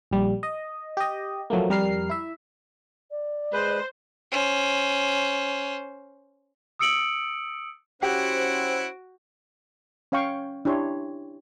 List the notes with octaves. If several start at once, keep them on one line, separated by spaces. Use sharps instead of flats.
A#1 G3
D#5
G4 D#5
F3 F#3 A3 A#3
F2 G3 A#4 F6 C7
E4 E5
D5
G#3 B4 C5
C#4 C5
D#6 E6 C#7 D7 F#7
C#4 E4 F#4 G4 C5 F#5 D7
C#4 C#5 F5 G5 C#6
D4 E4 G4 C#5 C6